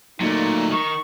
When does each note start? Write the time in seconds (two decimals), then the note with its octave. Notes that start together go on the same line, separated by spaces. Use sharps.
0.20 A#2 F#3 A3 D#4
0.72 D#3 C#6